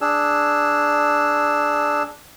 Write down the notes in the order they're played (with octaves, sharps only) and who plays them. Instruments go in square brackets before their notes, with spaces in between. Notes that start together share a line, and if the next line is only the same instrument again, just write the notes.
[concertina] D4 G#4 E6